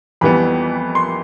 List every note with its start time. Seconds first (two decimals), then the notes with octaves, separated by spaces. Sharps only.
0.21 F2 E3 G3 B3 B5
0.95 C6